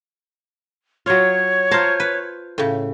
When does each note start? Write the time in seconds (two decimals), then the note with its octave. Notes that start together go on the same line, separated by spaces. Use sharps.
1.06 F#3 F4 C#5
1.71 F4 C5 A5 A#5
2.00 B4
2.58 A2 C#3